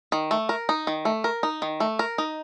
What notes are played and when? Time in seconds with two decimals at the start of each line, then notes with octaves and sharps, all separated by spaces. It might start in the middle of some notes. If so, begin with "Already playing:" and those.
0.12 D#3
0.31 A3
0.49 A#4
0.69 D#4
0.87 D#3
1.05 A3
1.24 A#4
1.43 D#4
1.62 D#3
1.80 A3
1.99 A#4
2.18 D#4